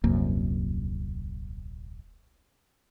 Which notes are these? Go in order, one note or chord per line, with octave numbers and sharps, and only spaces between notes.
D#1 C2 F#2 A#3